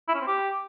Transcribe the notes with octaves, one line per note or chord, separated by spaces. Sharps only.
E4
C#4
C4
G4